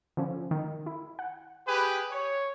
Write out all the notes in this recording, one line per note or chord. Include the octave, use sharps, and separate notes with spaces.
D3 F3 C#4
D#3
E4
F#5
G4 G#4 B4
C#5